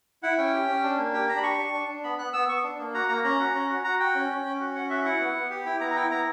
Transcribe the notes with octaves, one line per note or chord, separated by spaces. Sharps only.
E4 F#5
C#4 G5
G4
C#4
D4
A#3
G4 G5
D4 A#5
B5
G4 C#6
D4
D4
D4
B3 B5
B3 F#6
B3 E6
B3 C#6
D4
A#3
F#4 A#5
A#3 A#5
C#4 A#5
F#4
C#4
F#4
F#4 A#5
F#4 G5
C#4
C#4
C#4
F#4
C#4 F#5
F#4 E5
E4 F#5
B3
B3
G4
E4 G5
B3 A#5
A#5
E4 G5
B3 A#5